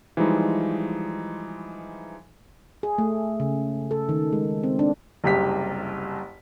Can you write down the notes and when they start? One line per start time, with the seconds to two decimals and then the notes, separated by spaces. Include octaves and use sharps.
0.17 E3 F3 G3 G#3 D#4
2.83 G#4
2.98 A3
3.40 C#3
3.91 A4
4.09 D#3
4.33 G#3
4.63 C4
4.79 D4
5.24 F#1 C2 G4 B6